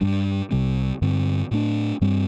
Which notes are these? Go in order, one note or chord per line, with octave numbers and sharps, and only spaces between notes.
G2 G3 D4
C2 C3 G3 C4
G2 D3 G3 C4
A2 A3 D4
G2 G3 C4